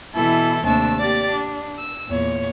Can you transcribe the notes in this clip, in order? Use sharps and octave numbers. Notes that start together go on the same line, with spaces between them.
B2 E3 E4 A4
D#2 C3 A3 D4 A5 E6
A#3 G4 D5 A6
D4
E6
E2 A#2 C#5